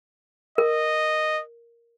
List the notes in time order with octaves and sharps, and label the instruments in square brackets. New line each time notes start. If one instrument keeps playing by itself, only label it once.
[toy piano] A#4 [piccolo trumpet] D#5